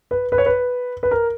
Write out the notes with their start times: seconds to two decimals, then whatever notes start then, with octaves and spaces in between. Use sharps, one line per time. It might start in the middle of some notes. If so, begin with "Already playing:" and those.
0.11 B4
0.32 B4
0.38 C#5
0.46 B4
1.03 B4
1.11 A#4